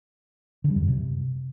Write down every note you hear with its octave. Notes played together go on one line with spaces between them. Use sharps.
D3
G3
F2
F#2
C3